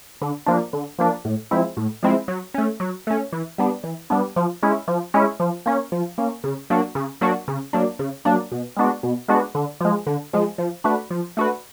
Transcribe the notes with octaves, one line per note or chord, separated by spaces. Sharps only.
D3
F3 A#3 D4
D3
F3 A#3 D4
A2
F3 G#3 C4 E4
A2
F3 G#3 C4 E4
F#3
A3 C#4
F#3
A3 C#4
E3
G3 B3 D4
E3
G3 B3 D4
F3
G#3 C#4 E4
F3
G#3 C#4 E4
F3
A#3 C#4
F3
A#3 C#4
C#3
F#3 A#3 D4 F#4
C#3
F#3 A#3 D4 F#4
C#3
F#3 A#3 D4
C#3
F#3 A#3 D4
B2
G#3 B3 D4 F#4
B2
G#3 B3 D4 F#4
D3
F3 G#3
D3
F3 G#3
F3
A3 D4 F#4 B4
F3
A3 D4 F#4 B4